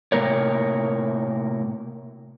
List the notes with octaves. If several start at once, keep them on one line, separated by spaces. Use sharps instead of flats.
A2 C3 G3 A#3 A#4 C#5